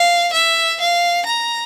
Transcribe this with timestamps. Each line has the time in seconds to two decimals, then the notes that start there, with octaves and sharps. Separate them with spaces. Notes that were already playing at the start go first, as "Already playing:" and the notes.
Already playing: F5
0.33 E5
0.81 F5
1.26 A#5